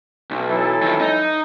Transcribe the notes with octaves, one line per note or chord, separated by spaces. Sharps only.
B1
E3 F#3 A4
D#3 F3
D#4